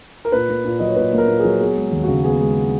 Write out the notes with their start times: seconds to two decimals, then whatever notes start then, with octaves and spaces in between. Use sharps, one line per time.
0.25 A#4
0.32 A#2 B4
0.49 A#3
0.65 A#2
0.79 F#3 D#5
0.89 C#5
0.96 A#2 B4
1.13 A#3
1.18 A#4
1.28 A#2
1.39 G#4
1.45 F#3
1.61 B3 G#4
1.76 G#3
1.92 D#2
2.03 C#3 F#4
2.24 B3 G#4
2.40 G#3